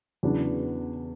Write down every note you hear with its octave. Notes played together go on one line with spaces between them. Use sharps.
E2 C#3 F#3 B3 D4